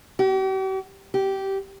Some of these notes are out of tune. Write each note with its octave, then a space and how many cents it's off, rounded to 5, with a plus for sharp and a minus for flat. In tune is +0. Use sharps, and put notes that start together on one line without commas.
G4 -45
G4 -15